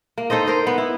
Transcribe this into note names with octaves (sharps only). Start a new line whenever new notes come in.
A#3
D#4 A4 C5 D#5
A#4 C5 D#5
B3
E4